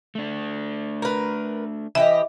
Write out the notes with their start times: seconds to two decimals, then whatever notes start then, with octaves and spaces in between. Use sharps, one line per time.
0.15 A3 D4
1.02 A#4 B4
1.95 E3 G4 D#5 E5